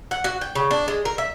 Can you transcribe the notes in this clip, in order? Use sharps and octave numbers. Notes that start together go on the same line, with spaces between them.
F#5
F#4
G5
C#3
D4
G#3
A#4
E5